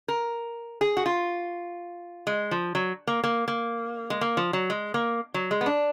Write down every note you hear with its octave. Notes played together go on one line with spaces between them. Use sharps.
A#4
G#4
F#4
F4
G#3
F3
F#3
A#3
A#3
A#3
G#3
A#3
F3
F#3
G#3
A#3
F#3
G#3
B3
D4